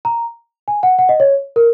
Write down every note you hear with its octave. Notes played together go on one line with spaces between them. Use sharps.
A#5
G#5
F#5
F#5
D#5
C#5
A#4